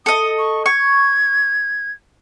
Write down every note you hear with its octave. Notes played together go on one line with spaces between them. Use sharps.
A4 D#5 D#6
C#6
C#6 G#6